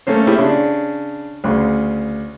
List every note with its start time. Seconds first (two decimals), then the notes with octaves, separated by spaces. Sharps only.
0.07 A3 A#3 C#4 C5
0.27 C#4 E4 G4 G#4
0.39 C#3 D4
1.44 D2 C#3